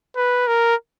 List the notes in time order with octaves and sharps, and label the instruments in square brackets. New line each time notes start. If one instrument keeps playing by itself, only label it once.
[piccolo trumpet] B4
A#4